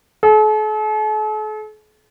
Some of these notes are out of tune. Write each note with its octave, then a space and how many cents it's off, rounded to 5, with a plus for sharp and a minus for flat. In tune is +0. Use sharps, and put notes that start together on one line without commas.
A4 -45